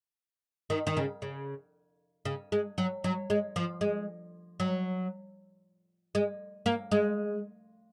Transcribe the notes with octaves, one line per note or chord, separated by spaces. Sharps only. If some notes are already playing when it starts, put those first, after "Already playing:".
D#3
D#3
C#3
C#3
C#3
G#3
F#3
F#3
G#3
F3
G#3
F#3
G#3
A#3
G#3